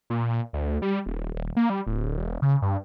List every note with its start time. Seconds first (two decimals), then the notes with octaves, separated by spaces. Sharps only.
0.10 A#2
0.53 D2
0.82 G3
1.06 D#1
1.35 D#1
1.57 A#3
1.70 G3
1.87 D1
2.18 E1
2.42 C#3
2.62 G2